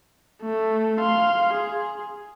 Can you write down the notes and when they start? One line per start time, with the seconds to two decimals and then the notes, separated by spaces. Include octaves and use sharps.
0.42 A3
1.00 F5 C6
1.53 G#4